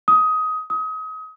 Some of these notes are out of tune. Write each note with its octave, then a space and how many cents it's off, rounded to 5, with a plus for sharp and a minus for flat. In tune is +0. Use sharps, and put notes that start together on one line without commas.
D#6 +15
D#6 +30